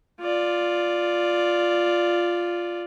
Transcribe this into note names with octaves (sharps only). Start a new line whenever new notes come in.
F4 D5